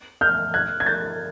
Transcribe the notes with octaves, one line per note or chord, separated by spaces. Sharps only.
F6 G6
F#6 G#6
G#6
G6 A6